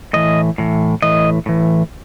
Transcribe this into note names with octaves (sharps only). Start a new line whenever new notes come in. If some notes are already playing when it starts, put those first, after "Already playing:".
A2 E3 D#5
A2 E3
A2 E3 D#5
A2 E3